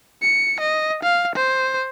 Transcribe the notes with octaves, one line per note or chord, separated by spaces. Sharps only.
C#7
D#5
F5
C5